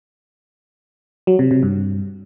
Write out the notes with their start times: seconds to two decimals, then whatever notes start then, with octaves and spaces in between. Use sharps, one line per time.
1.27 F#3
1.39 C3
1.51 C3
1.63 G2